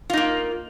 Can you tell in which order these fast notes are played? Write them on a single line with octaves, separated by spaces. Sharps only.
F4 D#4 A#3